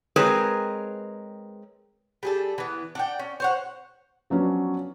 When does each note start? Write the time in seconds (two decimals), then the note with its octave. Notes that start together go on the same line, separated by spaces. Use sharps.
0.16 G#3 C4 G#4 A#4 B4 C#5
2.23 G3 G#4 A4
2.58 E3 B3
2.95 D4 F#5 G5
3.19 C#4
3.40 C5 C#5 F#5
4.30 F3 F#3 B3 C#4 D4